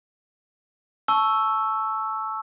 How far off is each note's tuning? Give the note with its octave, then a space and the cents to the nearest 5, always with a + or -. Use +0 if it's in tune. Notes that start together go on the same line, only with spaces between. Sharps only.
A5 -15 C#6 +0 E6 +0